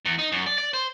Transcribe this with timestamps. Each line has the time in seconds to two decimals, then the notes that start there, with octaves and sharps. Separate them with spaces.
0.05 E2
0.18 D#4
0.32 F#2
0.47 D5
0.58 D5
0.73 C5